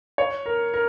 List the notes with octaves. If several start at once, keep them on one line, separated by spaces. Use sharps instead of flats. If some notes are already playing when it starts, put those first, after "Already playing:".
C#5
A#4
A#4